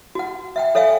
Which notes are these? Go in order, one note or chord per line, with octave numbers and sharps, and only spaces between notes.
F#4 F#5
E5 F#5 G5
A4 C#5 E5 F5 G5 G#5